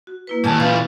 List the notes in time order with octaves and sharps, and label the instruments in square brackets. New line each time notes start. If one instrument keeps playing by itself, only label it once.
[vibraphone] F#4
A#3 E4 B4
[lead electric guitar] D#2 G#2 [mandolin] G#4 A#4 A5
[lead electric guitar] A#2 E3 [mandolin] F4